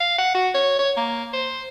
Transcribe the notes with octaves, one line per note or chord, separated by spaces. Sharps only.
F5
F#5
F#4
C#5
C#5
A#3
C5